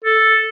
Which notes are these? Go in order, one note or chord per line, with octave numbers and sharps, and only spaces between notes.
A4